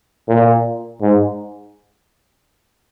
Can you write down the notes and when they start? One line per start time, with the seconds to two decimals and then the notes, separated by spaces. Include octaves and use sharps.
0.29 A#2
1.02 G#2